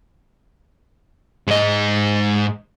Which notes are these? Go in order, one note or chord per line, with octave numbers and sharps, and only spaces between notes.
G#2 D#5